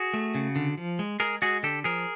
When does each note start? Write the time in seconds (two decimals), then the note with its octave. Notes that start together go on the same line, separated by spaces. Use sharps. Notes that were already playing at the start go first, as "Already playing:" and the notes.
Already playing: F#4 G#4
0.14 A3
0.35 C#3
0.56 D3
0.78 F3
0.99 G#3
1.20 G#3 G#4 A#4
1.42 G#3 F#4 G#4
1.63 D3 G4 A4
1.84 F3 G#4 A#4